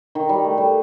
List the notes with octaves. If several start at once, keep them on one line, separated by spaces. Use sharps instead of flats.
D#3
G3
A3
G3